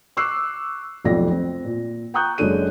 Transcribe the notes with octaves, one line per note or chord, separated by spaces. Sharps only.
C#6 D6 E6 F#6 C7
F1 B1 F2 F4 D5 A#6
C4
A#2
G5 A#5 C#6 D#6 F#6 G6
F#1 F#2 G#3 D4 A4 D#7